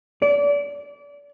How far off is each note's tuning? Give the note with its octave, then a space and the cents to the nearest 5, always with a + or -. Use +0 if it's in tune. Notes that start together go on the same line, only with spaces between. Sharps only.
D5 -30